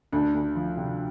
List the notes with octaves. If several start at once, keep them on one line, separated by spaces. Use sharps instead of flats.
D2 D4
D2
F3
C3